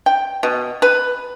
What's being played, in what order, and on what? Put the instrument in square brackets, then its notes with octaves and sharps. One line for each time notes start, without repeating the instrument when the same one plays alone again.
[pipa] G5
B2
B4